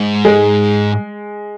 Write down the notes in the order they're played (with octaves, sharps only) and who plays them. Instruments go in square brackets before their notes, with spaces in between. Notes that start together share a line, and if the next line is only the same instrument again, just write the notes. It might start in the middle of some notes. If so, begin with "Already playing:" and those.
Already playing: [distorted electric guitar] G#2
[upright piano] G#3